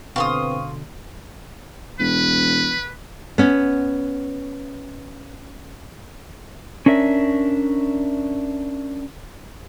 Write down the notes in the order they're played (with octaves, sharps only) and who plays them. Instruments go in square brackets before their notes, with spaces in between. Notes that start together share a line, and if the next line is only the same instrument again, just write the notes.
[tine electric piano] B2 D3 [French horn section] C4 B4 [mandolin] F5 C6 D#6 [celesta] C#6
[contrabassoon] E1 [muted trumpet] B4
[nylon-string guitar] B3 C#4
[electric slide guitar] C#4 D4 A#4 E5